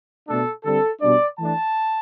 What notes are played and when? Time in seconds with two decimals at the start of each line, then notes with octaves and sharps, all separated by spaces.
0.27 B2 A3 D4 A4
0.64 D3 G3 C4 A4
1.01 B2 G3 D4 D5
1.38 E3 A3 D4 A5